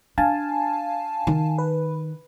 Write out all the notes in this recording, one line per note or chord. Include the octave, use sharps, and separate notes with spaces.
D4 F5 G#5 A5
D#3
B4